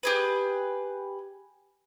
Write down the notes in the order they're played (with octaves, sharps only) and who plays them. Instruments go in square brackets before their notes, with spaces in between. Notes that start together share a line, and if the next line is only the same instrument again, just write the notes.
[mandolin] G4 G#4 B4